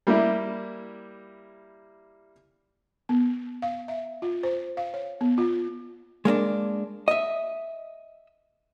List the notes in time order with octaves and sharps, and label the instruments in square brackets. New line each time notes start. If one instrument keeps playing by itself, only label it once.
[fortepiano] G3 A#3 E4 G4 E5
[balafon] B3
F5
E5
F4
C5
F5
C#5
B3
F4
[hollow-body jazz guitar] G#3 A#3 C#4 D4
D#5 E5